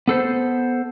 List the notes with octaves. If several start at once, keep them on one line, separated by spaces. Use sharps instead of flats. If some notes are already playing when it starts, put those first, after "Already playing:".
B3 A4 C5